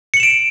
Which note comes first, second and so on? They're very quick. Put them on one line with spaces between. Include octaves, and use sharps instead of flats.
C#7 F#7 E7 D7